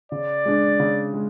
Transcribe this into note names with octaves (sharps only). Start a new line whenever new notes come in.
C#3 D5
G#3 D4
C#3
G#3